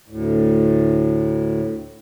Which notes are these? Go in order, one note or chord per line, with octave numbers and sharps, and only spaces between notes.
D2 A2